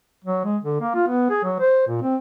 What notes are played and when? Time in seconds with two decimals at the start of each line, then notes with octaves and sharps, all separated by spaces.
0.25 F#3
0.45 G#3
0.63 D3
0.81 A#3
0.95 F4
1.08 B3
1.30 G#4
1.44 F#3
1.60 C5
1.87 A#2
2.02 C4